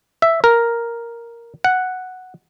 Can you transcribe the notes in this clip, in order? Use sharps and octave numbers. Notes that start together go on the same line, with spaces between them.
E5
A#4
F#5